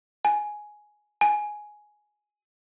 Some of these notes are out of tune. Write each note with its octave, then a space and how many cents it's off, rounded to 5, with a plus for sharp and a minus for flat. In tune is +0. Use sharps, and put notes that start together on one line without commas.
G#5 +10
G#5 +10